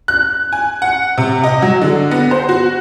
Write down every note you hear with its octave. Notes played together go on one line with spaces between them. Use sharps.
F#6
G#5
F#5
C3
D#5
F#3
D3
B3
C5
F#4